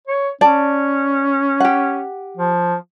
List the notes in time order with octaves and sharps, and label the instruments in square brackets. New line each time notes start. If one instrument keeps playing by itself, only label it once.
[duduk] C#5
[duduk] C#4 [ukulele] D5 A5
[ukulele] G4 F#5
[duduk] F3